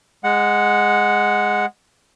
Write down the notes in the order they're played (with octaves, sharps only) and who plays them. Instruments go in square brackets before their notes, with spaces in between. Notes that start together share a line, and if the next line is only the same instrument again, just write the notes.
[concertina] G#3 F#5